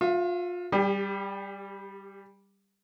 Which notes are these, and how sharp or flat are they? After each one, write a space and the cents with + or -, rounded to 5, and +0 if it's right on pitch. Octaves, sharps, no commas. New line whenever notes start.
F4 +30 F5 -40
G3 +0 G4 +40